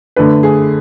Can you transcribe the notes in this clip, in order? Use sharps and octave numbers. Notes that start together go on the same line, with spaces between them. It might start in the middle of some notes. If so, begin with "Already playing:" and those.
D3 A3 D4 B4
G#4